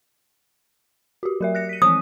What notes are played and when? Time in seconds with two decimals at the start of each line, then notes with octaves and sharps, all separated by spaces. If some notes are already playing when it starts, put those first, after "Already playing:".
1.23 F#4 G4
1.41 F#3 A#4 E5
1.55 F#6 A#6 C#7
1.69 B6 D#7
1.82 E3 F3 C4 D#6